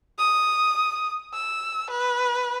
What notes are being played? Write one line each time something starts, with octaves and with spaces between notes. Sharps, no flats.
D#6
E6
B4